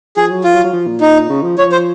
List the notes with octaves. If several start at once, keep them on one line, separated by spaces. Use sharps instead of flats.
F3 G#4
F#3
F3 F4
F#3
F#3
F3
A#2
D#4
C#3
F3
F3 C#5
C5